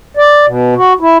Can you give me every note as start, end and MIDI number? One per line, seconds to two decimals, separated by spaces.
0.17 0.46 74
0.46 0.74 47
0.76 0.93 66
1.00 1.17 64